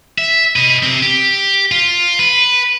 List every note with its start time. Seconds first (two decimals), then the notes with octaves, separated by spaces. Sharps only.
0.18 E5
0.56 B4 D#5
0.83 C3 C4
1.02 G4
1.72 F4
2.19 B4